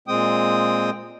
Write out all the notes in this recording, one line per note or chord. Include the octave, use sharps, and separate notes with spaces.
A#2 G#3 C4 G5 D#6